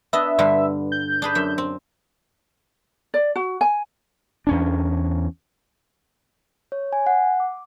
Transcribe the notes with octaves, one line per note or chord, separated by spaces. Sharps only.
B3 D4 D#5 E5
G2 D3 G3
G6
D4 G#4 B4
F#2 E5
C4
D5
F#4
G#5
E2 C#4 D4
C#5
G#5
F#5
D6